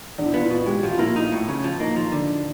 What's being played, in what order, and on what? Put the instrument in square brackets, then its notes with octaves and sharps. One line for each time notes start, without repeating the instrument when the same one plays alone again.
[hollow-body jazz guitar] E2 [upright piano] D4
[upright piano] E4
[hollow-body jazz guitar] B3 [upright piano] F4
[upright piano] E4
[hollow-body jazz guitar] B2 [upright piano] F4
[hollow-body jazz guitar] G#3 [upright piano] G4
[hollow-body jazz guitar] F3 [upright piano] F#4
[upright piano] F4
[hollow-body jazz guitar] A#3 [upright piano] E4
[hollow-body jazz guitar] D#4
A2
C#3
F3
[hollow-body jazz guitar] A#3 [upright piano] D#4
[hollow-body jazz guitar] F3
D3